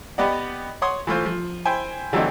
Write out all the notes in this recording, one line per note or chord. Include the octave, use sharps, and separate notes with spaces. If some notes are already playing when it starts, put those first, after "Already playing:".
B3 G4 D5 D#5 F#5
C#5 F#5 C6 D#6
E3 A3 F4 C5
F3
E4 C5 G5 G#5
D3 E3 F#3 A3 C4 D#4